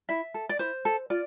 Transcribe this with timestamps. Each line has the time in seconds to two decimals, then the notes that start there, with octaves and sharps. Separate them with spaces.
0.09 E4 E5
0.34 A4
0.49 D5
0.59 E4 C5
0.85 A4
1.10 F4 D5